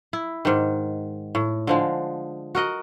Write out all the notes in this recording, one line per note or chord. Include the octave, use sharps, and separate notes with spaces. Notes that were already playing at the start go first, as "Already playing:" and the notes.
E4
G#2 D#3
A2
D3 F3 G#3
F#4 A#4 D#5 F#5